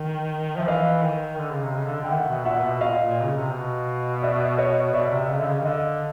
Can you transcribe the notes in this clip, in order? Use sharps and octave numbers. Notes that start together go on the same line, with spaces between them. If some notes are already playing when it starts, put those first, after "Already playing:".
Already playing: D#3
F3 E5
E3 D#5 F5
D#3
D3
C#3
C3
C#3
D3
D3 G5
D#3 E5 F#5
B2
A#2 E5 F#5
B2
B2 D#5 F5
A#2
A#2
C#3
C3
B2
D5 E5
C#5 D#5
B2 D5 E5
C3
E5
C#3 D#5 F5
D3
C#3
D#3
D3 D#5 F5